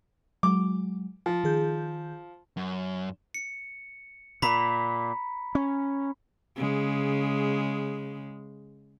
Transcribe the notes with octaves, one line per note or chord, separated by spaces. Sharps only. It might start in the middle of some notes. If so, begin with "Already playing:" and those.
F#3 G#3 D6
F3
D#3 G#4 G6
F#2
C#7
A#2 A#5 B5 B6
C#4
C#3 G#3